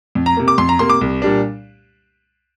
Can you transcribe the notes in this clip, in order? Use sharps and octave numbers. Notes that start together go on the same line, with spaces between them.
F2
A#5
C3 A#3
D6
F2 C6
A#5
C3 A#3 C6
D6
C2
A#2 G3 D4